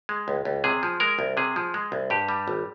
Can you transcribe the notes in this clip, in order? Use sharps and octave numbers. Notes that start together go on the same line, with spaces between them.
G#3
C#2
C#2
C3 G#4
F3
G#3 A#4
C2
C3 G#4
F3
G#3
C2
G2 G4
G3
G#1